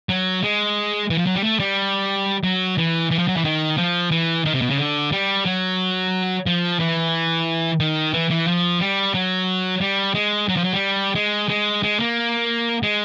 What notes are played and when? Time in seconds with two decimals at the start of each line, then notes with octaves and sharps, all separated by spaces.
0.09 F#3
0.43 G#3
1.10 E3
1.18 F3
1.26 F#3
1.36 G3
1.44 A3
1.60 G3
2.44 F#3
2.78 E3
3.11 E3
3.19 F3
3.28 F#3
3.36 E3
3.45 D#3
3.78 F3
4.11 E3
4.45 D#3
4.54 C3
4.62 B2
4.70 C#3
4.78 D3
5.12 G3
5.45 F#3
6.46 F3
6.80 E3
7.80 D#3
8.14 E3
8.30 E3
8.47 F3
8.81 G3
9.14 F#3
9.81 G3
10.14 G#3
10.49 F#3
10.56 F3
10.64 F#3
10.73 G3
11.15 G#3
11.49 G#3
11.83 G#3
12.00 A#3
12.83 G#3